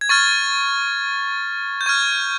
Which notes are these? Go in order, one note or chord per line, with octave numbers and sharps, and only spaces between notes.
G#6
C#6 F6 A6
G6
C#6 F6 G#6